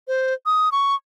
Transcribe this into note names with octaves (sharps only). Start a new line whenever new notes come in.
C5
D#6
C#6